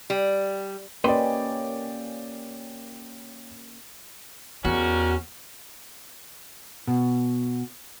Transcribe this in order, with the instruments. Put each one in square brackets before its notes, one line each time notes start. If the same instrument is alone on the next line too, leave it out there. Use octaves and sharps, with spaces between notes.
[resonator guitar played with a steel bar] G3
[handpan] A#3 C#4 G4 [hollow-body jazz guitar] B4 D#5 C6 [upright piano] D5 G5
[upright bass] E2 B3 [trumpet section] G3 C#4 A#4 [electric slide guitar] F#4
[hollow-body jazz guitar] B2